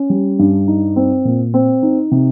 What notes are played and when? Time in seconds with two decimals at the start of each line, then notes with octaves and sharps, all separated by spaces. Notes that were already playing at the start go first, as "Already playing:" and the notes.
Already playing: C#4
0.10 G3
0.39 G2
0.67 D#4
0.96 C4
1.25 A#2
1.54 C4
1.83 D#4
2.11 C3